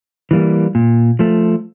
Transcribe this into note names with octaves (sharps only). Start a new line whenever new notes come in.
E3 G3 A#3
A#2
F3 A3